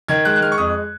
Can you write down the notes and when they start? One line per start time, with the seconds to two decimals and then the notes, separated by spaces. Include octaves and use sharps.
0.08 D#3 G#6
0.25 G#3 F#6
0.36 F#6
0.42 G#3 F6
0.52 C#6
0.58 F2 D#6